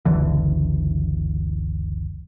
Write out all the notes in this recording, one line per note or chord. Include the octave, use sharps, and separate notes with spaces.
F#1 C#2 D3 E3